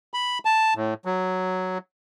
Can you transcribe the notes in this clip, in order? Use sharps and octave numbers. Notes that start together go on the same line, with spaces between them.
B5
A5
A2
F#3